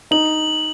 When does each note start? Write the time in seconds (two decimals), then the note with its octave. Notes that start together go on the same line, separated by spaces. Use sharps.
0.11 D#4 F#7